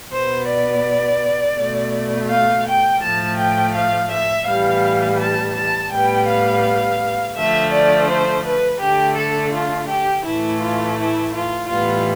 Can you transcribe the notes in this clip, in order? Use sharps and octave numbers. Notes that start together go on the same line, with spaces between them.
B2 B3 C5
D5
B2 A3
F5
G5
A2 F3 A3 A5
G5
F5
E5
A2 E3 G3 B3 F5
A5
A5
A2 G3 B3 G5
F5
D3 F3 A3 E5
D5
C5
B4
D3 A3 G4
A4
F4
G4
A2 E3 A3 E4
F4
E4
F4
A2 E3 G3 B3 F4